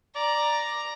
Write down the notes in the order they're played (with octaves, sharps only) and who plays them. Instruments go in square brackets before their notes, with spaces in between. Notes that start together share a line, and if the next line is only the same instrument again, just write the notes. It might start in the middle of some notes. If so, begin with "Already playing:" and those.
[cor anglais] D5 [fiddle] A#5